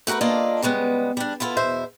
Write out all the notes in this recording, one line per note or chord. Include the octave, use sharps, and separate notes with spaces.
A3 F#4 G4 A#4 B4
A#3 D4 F4 A4 D5 D#5
C#3 G3 G#3 B3
G3 D4
B3 E4 F4 G4 A4
E2 B2 C5 E5